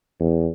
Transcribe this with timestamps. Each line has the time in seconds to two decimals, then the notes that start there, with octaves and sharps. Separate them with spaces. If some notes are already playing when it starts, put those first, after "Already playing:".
0.20 E2